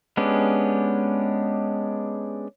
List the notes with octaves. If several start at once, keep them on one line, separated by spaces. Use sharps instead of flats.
G#3 B3 C#4 D4 G4